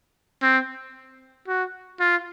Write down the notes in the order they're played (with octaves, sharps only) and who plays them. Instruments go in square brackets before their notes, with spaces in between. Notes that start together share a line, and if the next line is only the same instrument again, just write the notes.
[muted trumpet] C4
F#4
F4